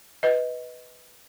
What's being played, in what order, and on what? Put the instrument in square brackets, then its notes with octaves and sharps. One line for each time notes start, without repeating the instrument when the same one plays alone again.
[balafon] B4 D#5